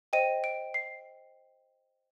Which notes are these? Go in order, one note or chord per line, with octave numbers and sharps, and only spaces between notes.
C5 D#5 G5 D#7
D7
C7